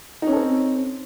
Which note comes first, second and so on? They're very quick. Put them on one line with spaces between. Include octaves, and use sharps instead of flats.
D#4 C#4 A4 C4